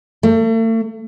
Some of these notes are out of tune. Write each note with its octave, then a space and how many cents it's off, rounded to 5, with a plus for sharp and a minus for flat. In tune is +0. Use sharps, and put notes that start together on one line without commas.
A3 +40